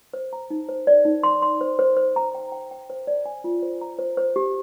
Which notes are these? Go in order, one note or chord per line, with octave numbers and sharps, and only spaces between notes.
C5
A#5
D#4
C5
D5
D#4
C6
C6
C5
C5
C5
A#5
G5
G5
G5
C5
D5
G#5
F4
C5
A#5
C5
C5
G4